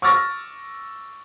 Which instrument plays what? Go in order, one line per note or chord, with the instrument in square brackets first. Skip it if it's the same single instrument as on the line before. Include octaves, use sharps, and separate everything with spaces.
[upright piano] C#6 D6 E6 F6 A6 A#6